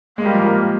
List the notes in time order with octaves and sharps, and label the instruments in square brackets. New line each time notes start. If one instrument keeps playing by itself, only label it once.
[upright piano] G#3 [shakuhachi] A#3
[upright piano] G3
F3
G3